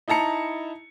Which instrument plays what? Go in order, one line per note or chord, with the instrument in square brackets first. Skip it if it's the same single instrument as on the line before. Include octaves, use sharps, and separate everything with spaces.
[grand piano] D#4 E4 A5 A#5 C#7